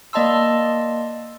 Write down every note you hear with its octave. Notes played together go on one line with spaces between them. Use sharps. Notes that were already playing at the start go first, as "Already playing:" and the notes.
A#3 D5 D#5 A5 C6 E6